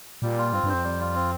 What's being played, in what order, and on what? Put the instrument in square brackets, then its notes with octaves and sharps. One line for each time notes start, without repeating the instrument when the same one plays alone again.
[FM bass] A#2 [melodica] G3
[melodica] F4
[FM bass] G2 [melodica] C4
[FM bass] G2
[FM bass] F2 [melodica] C5
[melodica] G3
F4
C4